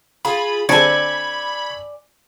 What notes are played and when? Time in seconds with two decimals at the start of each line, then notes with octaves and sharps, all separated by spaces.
0.25 F4 G#4 B5
0.69 D3 C4 D5 G#5 A5 B5 C#6 G#6